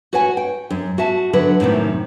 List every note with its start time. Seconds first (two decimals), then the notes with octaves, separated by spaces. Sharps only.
0.13 F#4 B4 C#5 F#5 G#5
0.37 G5
0.70 F#2
0.98 F#4 E5 A5
1.33 D3 F#3 B4
1.60 F#2 A2 C3 D#3